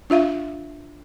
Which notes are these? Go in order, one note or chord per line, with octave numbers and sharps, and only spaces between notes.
D4 F4 E5 F5